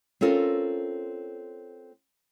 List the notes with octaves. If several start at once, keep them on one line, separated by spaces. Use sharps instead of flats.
C4 C#4 F4 A4 A#4